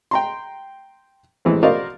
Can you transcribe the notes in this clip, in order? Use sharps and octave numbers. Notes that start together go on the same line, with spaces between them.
G5 A#5 C6
A1 E3 G#3 C4
F#4 A#4 C5 D5 D#5 F5